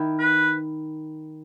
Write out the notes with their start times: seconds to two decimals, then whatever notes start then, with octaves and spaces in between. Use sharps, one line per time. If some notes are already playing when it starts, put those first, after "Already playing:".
Already playing: D#3 E4
0.19 B4